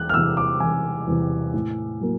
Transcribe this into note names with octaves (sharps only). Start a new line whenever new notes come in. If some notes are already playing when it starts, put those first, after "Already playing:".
Already playing: E1 F#6
F6
E2 C3 E6
D6
E1 G#5
E2 C3
A2
F#3 A#3